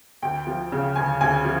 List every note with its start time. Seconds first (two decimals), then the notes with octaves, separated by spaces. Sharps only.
0.22 D2 G5
0.47 F3
0.72 C#3
0.96 D2 G#5
1.21 D2 G#5
1.45 F3